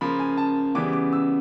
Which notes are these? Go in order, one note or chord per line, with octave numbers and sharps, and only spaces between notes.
C#3 F3 A#3 B5
G#5
A5
C#3 E3 G3 B3 D6
D6
E6